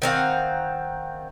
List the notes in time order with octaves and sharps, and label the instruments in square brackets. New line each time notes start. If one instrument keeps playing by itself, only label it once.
[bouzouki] D#3 C4 F5 F#5